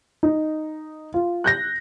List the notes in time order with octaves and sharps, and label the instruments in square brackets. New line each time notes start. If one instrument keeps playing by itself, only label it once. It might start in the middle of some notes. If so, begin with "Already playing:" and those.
[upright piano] D#4
F4
F#6 G6 A#6